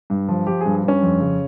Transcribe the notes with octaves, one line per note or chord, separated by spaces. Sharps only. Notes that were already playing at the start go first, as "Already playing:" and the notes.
G2
F3
F3 G4
G2 G#4
G2 C#4
F2
C#3